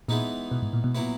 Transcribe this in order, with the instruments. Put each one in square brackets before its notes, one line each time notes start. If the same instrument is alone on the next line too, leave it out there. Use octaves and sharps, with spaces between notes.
[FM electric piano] A#2 [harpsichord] E3 G#3 B3 D#4
[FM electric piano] B2
G#2
A#2
B2
[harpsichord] A#2 F#3 B3 E4